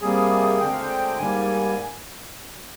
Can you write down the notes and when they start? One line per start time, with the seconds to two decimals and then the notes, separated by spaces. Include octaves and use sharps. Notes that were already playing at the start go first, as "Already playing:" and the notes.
0.02 C3 G3 A#3 G#4
0.60 D2 D3 G#3 C4 G5
0.71 F5
0.82 G5
1.18 G#2 G3 A#3 G#5